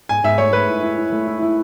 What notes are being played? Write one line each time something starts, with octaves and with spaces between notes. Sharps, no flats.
G#2 G#5
G#2 E5
A3 C#5
A3 B4
E4
E4
E4
A3
E4
E4